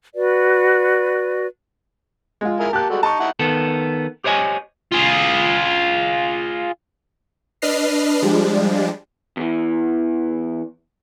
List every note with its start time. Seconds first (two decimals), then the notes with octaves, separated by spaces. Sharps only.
0.15 F#4 B4 D5
2.41 G#3 F4
2.60 E4 G#4 A#4
2.73 A#3 G4 A5 F#6
2.90 G3 G#3 F#4 A4
3.03 D#4 A5 C#6
3.20 D#4 E4 F#5
3.39 D#3 B3 A4
4.24 G4 C5 C#5 D#5 G#5
4.92 F4 G#4
7.62 D4 B4 D#5 F6 C7
8.22 F3 G3 G#3 D4
9.37 E2 E3